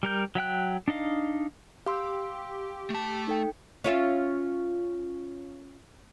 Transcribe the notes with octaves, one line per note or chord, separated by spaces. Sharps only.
G3 A#4 G6
F#3 E5 G5 F#6
D4 D#4 D#5 F5
G4 F5 C6 E6
A3 A5
D#4 A4 G5
C#4 F4 E5